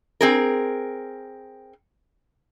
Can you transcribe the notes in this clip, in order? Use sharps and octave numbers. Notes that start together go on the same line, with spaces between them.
C4 G#4 A#4